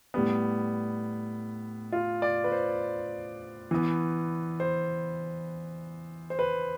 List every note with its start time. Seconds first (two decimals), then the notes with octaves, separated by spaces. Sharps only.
0.14 A2 G3 B3
1.92 F4
2.22 D5
2.44 B4
2.52 C5
3.71 E3 B3
4.60 C5
6.30 C5
6.39 B4